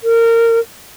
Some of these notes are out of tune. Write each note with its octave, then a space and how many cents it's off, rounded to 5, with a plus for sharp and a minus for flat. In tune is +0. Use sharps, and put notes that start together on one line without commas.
A#4 -20